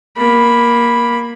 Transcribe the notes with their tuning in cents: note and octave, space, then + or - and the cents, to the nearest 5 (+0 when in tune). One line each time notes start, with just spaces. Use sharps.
A#3 +15 B5 -5